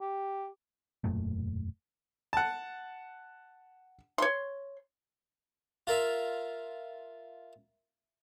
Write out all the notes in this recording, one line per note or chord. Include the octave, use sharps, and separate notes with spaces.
G4
E1 F#2 A#2 A3
F#5 A5
C#5 C6
F4 A#4 E5